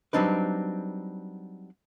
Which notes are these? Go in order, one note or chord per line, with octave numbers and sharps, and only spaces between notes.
F#3 G3 C4 D4 D#4 B4